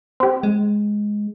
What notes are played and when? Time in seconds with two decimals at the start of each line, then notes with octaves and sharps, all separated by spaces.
0.20 C4 G4
0.43 G#3